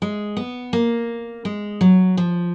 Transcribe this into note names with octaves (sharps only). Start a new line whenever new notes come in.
G#3
B3
A#3
G#3
F#3
F3